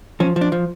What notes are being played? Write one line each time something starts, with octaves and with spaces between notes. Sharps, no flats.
F3 C#4
F3
D4
F3